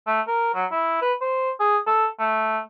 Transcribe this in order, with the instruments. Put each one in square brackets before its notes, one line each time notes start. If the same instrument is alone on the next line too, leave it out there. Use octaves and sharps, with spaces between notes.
[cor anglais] A3
A#4
F#3
E4
B4
C5
G#4
A4
A3